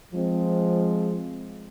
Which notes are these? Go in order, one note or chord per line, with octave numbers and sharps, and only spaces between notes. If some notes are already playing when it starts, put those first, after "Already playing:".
F3 G#3 C4